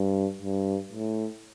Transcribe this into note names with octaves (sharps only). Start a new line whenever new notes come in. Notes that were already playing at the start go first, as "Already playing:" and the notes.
Already playing: G2
G2
A2